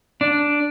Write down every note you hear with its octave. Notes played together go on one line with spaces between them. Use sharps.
D4